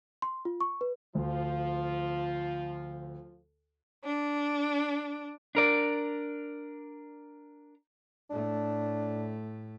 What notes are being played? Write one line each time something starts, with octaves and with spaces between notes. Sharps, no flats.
C6
F4
C#6
B4
D2 F3 F4
D4
D4 A#4 D5
A2 A3 D4